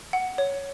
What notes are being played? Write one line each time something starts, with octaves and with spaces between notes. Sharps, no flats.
F#5
C#5